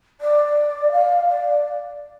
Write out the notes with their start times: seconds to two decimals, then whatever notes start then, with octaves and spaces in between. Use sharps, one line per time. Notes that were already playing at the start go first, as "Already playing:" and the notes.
0.21 D5
0.92 F5
1.29 D5